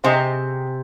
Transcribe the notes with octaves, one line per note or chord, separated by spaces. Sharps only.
C3 C4 G#4 D#5